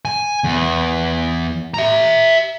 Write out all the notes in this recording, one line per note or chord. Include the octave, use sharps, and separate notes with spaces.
G#5
E2
E5 A#5